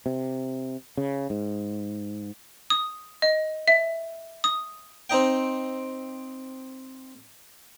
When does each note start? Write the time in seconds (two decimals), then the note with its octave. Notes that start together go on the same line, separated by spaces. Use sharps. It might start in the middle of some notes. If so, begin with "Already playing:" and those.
0.06 C3
0.97 C#3
1.30 G#2
2.70 D#6
3.22 D#5
3.68 E5
4.44 D#6
5.10 C4 D#4 D#5 G5